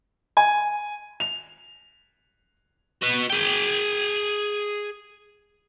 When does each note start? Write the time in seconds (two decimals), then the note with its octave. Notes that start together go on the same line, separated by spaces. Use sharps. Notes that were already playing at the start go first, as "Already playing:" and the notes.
0.37 G#5
1.20 F7
3.02 F#4 B4
3.30 G#4 G5